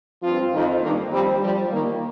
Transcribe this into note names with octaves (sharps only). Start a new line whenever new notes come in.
G2 F3 C4 F4
F2 D#3
G2 D#3 A#3
F2 F3 G3 C4
G2 F3 G3
D#2 D#3 A#3